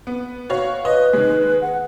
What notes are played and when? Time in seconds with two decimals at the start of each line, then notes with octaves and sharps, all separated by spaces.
0.07 B3
0.50 F#4 C#5 F5
0.85 B4 D#5
1.13 D#3 G#3
1.61 F#5